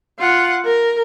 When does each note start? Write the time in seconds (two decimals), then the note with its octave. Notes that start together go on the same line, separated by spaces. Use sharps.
0.19 F4 F#5
0.65 A#4